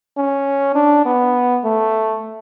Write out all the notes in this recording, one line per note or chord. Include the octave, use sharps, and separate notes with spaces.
C#4
D4
B3
A3